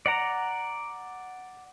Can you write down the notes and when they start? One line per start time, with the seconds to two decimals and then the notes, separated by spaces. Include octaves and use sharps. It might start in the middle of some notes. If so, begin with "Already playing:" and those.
0.06 D5 F#5 A#5